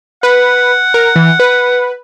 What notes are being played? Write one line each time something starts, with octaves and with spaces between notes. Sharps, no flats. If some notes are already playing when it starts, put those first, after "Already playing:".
B4 F#5
A#4
E3
B4